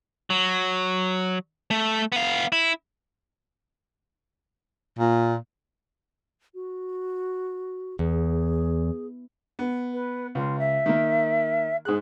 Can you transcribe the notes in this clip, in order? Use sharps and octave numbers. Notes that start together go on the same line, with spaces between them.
F#3
A3
B3 F5
E4
A#2
F#4
E2 G#4
B3
B4
C#2 F4
E5
D#3 A#3
G#2 G#4 F#6